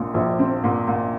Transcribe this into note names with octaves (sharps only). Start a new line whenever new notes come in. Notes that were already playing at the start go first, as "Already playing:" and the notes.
Already playing: A#1 A#2
A#1
C4
A#2
A#2